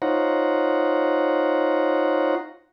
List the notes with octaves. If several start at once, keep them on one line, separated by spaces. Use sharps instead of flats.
D#4 F4 C5 C#5 F#5 A#5